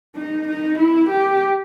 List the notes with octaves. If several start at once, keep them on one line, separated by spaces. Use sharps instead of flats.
D#4
D#4
E4
G4